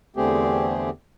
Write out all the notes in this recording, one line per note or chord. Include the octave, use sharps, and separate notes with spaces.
E2 D3 A3 C4 G4 G#4